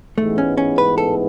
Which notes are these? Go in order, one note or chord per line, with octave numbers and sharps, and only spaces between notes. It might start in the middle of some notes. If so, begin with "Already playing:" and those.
A1 G#2 E3 G#3 A3 B3
C#4
C#4
B4
A4